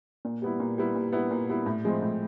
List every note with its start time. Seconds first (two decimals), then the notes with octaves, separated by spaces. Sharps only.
0.25 A#2
0.42 G3 B3 E4
0.60 A#2
0.78 G3 B3 E4
0.95 A#2
1.12 G3 B3 E4
1.31 A#2
1.49 G3 B3 E4
1.66 A2
1.84 F3 G#3 C4
2.02 A2